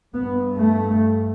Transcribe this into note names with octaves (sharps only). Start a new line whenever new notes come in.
G2 B3
A3